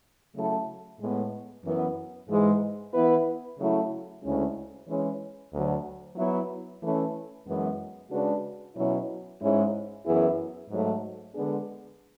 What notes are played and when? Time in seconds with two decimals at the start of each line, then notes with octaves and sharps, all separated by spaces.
0.34 C#3 F#3 A3 E4 A4
0.99 A2 G#3 B3
1.64 F#2 E3 B3 E4
2.29 G#2 E3 G#3
2.93 E3 B3 E4 B4
3.58 C#3 F#3 A3 E4
4.23 D2 C#3 G#3 C#4 E4
4.87 E3 G#3 C#4
5.52 D2 D3 F#3
6.16 F#3 B3 E4
6.82 E3 A3 C#4
7.46 F#2 E3 G#3 B3
8.10 C#3 G#3 D4 F#4 B4
8.76 B2 F#3 C#4 E4
9.41 G#2 G#3 C#4 E4
10.05 F#2 E3 B3 E4 G#4
10.70 G#2 F#3 A3
11.35 D3 G#3 B3 D4 G#4